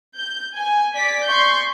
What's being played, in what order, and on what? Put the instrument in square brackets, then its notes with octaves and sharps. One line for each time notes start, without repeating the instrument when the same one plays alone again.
[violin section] G6
G#5
D5 B6
C6 C#6 G6